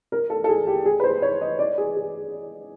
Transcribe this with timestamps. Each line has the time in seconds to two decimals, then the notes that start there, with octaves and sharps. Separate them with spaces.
0.12 A#4
0.30 A4
0.44 A4
0.48 G#4
0.67 G4
0.85 G#4
1.00 B4
1.04 C5
1.22 C#5
1.41 D#5
1.59 D5
1.78 G#4
1.96 G#4